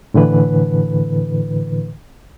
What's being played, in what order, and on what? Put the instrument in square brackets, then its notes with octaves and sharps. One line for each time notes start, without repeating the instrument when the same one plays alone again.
[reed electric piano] A2 D3 E3 B4